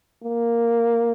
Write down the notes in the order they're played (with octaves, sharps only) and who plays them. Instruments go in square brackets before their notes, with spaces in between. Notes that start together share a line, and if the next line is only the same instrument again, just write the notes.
[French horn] A#3